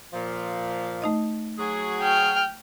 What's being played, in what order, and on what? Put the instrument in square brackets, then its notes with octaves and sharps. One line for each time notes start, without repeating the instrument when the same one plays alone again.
[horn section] A#2 F3
[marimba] A3 D#4 D#5
[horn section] F#3 F#4 G#4
[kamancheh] G5 F6